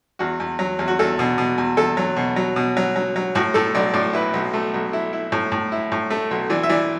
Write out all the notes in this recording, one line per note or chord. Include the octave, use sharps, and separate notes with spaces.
E2 F#4
E2
F#3
E2
F#4
E2 A4
B2
B2
E2
E2 A4
F#3
B2
F#3
B2
F#3
F#3
F#3
A2 F#4
A2 A4
B1 D5
A2 D5
E4 B4
B1
A3
B1
E4
E4
A2
A2
E4
A2
A3
B1
E3 D5
E5
E3 D5